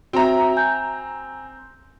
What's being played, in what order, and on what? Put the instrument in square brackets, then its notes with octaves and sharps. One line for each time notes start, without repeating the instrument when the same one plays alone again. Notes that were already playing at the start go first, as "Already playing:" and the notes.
[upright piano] C4 A#5 [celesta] F#4 E5
[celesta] G#5 G6